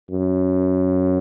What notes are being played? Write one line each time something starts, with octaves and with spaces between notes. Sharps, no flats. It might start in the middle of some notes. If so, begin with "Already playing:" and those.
F#2